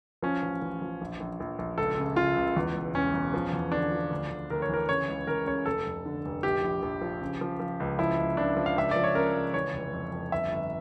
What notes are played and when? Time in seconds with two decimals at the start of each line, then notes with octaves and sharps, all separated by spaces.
0.22 F3 C#4
0.42 A1
0.62 A1
0.82 F3
1.01 A#1
1.20 A#1
1.40 A#1
1.59 A#1
1.78 C#2 A4
1.98 C#3
2.16 C#3 F4
2.36 C#2
2.56 E2
2.75 E1
2.94 E1 C#4
3.14 E1
3.34 F3
3.53 E2
3.72 D3 D4
3.92 F3
4.11 D2
4.30 D2
4.50 D2 A#4
4.62 C#5
4.69 E3 A#4
4.89 C#3 C#5
5.08 C#2
5.27 E3 A#4
5.46 C#3 C#5
5.66 F1 A4
5.86 F1
6.06 D3
6.25 F1
6.43 A#1 G4
6.64 A#1
6.82 A#1
7.01 F3
7.22 C#3
7.41 F3
7.60 F3
7.80 C#2
7.99 F3 E4
8.19 C#2
8.37 C#2 D4
8.57 F3
8.66 F5
8.76 C#2 E5
8.91 F3 D5
9.04 C#5
9.15 C#3 A#4
9.35 C#2
9.54 E3 C#5
9.73 F1
9.93 F2
10.12 F2
10.31 G1 E5
10.52 G1